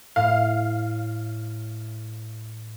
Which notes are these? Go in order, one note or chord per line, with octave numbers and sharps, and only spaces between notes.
A2 F5